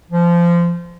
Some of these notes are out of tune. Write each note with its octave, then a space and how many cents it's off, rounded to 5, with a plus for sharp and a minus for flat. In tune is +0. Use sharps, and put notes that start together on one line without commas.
F3 -20